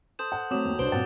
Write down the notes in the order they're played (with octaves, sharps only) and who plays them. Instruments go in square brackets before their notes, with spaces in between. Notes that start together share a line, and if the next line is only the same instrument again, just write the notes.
[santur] A4 C5 [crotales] D#6 G6 E7
[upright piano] F#5
[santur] F#3 [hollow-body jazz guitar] A3 C4 [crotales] D6 D#6 E7
[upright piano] D#2
[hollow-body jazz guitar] C2 [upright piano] D4 C5 [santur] B4 [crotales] D7 G7
[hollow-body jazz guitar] G2 A#2 C4 [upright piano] F#5 [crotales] A6